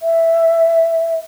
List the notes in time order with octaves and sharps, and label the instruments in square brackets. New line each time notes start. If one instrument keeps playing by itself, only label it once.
[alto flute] E5